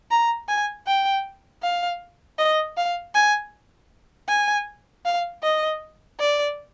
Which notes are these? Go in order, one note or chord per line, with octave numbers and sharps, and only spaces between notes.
A#5
G#5
G5
F5
D#5
F5
G#5
G#5
F5
D#5
D5